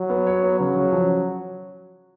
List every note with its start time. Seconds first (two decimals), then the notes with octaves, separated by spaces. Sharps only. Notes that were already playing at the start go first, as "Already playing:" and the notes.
Already playing: F#3
0.10 B3
0.27 C#5
0.43 B3
0.59 C#3 F#3
0.76 C#3
0.92 F3